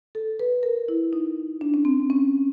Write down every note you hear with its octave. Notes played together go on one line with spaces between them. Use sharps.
A4
B4
A#4
E4
D#4
D4
C#4
C4
C#4